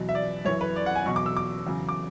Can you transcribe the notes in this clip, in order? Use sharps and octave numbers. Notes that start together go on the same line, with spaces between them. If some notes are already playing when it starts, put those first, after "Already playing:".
Already playing: E2 B2 F#3
E5
D5
F#2 E3 C#5
B4
D5
F#5
G#5
E2 B2 F#3 C#6
D6
E6
D6
E2 C#3 F#3
D6